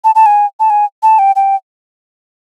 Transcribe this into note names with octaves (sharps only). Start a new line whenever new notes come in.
A5
A5
G#5
A5
G#5
A5
G5
G5